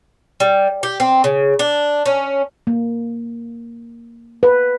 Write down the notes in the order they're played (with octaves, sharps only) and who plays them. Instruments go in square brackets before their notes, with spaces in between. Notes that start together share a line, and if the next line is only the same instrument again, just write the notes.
[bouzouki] G3
G4
C4
C#3
D4
C#4
[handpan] A#3
B4